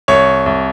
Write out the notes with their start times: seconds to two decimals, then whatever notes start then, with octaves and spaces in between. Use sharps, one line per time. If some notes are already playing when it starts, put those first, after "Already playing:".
0.08 C2 C#5
0.46 C2